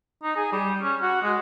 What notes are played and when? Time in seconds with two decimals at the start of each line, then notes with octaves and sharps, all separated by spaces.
0.23 D#4
0.37 G#4
0.52 G3
0.82 C#4
1.02 F#4
1.23 G#3